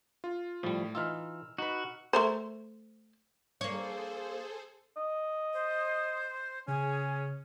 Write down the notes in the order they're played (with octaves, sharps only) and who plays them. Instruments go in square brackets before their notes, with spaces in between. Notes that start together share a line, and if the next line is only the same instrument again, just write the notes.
[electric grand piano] F4
[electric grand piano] A2 [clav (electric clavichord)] F3 G3
[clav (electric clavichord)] E3 D#4 F4 [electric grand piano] E6 F6
[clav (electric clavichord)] D#4 B4 [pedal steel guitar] F#4
[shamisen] A3 A#4 C5
[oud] A#3 C#5 [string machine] G#4 A4 C5
[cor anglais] D#5
[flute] C5
[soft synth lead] C#3 [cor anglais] C#4 [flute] G#4